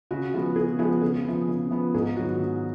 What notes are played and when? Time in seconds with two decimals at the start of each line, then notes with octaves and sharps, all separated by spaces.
0.11 C#3 F#4
0.34 F3 G#3 B3
0.56 C#3 G#4
0.79 F3 G#3 B3 G#4
1.01 C#3 G#4
1.25 F3 B3
1.47 C#3
1.71 F3 B3
1.94 G#2 G#4
2.16 D#3 F#3 B3 F#4
2.40 G#2